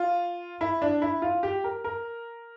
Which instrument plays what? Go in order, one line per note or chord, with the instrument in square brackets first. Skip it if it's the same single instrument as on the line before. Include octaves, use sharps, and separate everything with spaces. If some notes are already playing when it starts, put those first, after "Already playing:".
Already playing: [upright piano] F4
E4
D4
E4
F4
G4
A#4
A#4